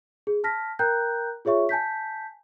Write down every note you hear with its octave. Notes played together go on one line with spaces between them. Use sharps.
G#4
A5 F6 A#6 B6
A#4 G5 A#5 F#6 G6
F4 G#4 C#5 E5 C#6
G#5 A5 G6 B6